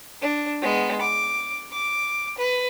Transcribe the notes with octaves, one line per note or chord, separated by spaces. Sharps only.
D4
G#3 B3
D6
D6
B4